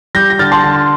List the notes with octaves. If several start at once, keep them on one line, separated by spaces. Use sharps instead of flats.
G3 G6 A#6
A#6
D3 F6 A6
A5 C6
D3